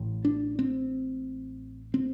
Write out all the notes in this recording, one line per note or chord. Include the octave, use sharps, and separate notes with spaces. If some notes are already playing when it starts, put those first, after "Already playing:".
Already playing: A1 A2
D4
C4
C4